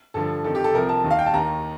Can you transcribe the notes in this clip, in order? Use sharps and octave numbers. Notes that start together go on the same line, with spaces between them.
G2 D3 F3 A4
F2 D#3 A4
G4
A4
C2 C3 F3 A#4
A5
D#2 D#3
F5
G5
A5
D#2 D#3 A#5